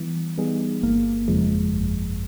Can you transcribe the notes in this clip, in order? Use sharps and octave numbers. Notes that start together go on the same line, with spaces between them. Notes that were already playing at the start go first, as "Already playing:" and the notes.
Already playing: E3 G3 B3
G3 B3 D#4 G#4
G1 A#3
F2 C#3 F3 G#3
G1